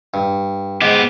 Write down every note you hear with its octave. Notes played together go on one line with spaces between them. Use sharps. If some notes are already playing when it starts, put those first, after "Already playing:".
G2
G#2 B3 G4